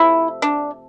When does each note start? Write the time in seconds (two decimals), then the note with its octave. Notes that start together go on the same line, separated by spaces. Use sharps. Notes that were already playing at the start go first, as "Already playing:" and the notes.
Already playing: C3 F3 A3 E4
0.42 D4